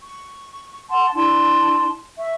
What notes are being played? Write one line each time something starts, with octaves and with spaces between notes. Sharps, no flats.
C#6
F#5 A5 C6
D4 E4 A5 C6
E5 C#6